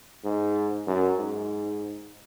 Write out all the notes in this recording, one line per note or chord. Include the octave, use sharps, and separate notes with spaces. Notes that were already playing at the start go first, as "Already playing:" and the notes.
G#2
F#2
G#2